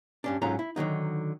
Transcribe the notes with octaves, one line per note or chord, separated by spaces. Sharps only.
G2 C#4 D4
G#2 F#3 C#4 F4 A4 A#5
E4
D3 D#3 F#3 D#4